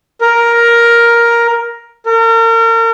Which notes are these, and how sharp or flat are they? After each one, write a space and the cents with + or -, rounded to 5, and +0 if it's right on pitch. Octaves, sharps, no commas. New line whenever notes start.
A#4 +10
A#4 -35